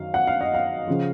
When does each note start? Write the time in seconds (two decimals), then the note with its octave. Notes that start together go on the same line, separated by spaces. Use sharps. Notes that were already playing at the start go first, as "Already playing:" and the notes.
Already playing: F#2 D#3 F#3 F5
0.14 F#5
0.27 F5
0.41 D#5
0.54 F5
0.88 C#3 F3